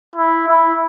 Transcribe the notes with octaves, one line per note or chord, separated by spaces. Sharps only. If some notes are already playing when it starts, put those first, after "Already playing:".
E4
E4